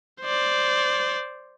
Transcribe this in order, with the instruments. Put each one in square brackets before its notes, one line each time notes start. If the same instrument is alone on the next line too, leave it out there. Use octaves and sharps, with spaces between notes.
[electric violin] C5 D5